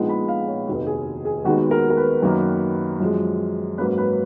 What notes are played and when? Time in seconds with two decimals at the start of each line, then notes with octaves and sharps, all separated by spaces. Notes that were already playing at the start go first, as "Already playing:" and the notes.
Already playing: A#1 A#2 G#3 B3 D#4
0.09 B5
0.28 F5
0.48 C#5
0.67 F1 D#2 D#3 F#4
0.87 G#4
1.25 G#4
1.45 D#2 D#3 G#3 B3 D#4 F#4
1.71 A#4
1.90 A#4
1.97 B4
2.22 F#2 D#3 F#3 A#3 D#4
3.00 F#2 F3 G#3
3.78 G#2 F#3 A#3 C#4 B4
3.98 B4